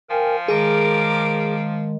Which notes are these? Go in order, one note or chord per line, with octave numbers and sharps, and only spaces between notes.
F3 A#4 G5 G#5
D#3 G#3 G#4 A#4 D6